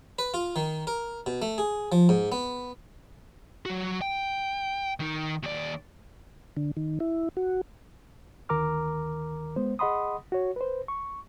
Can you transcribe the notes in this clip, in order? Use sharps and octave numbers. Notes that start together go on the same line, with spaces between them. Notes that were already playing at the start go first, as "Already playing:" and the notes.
B4
F4
D#3
A#4
B2
A3
G#4
F3
G#2
B3
F#3 F#4
G5
D#3 D#4
D#2 D5
D3
D#3
E4
F#4
D2 D#3 A#4 A#5 D6 F6
G#3 B3 C5
G#4 D#5 F#5 B5 C6 D#6
F#4 C#5
B4 C5
C#6